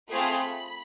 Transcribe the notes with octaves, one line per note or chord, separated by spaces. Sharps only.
A3 C4 F4 G#4 B5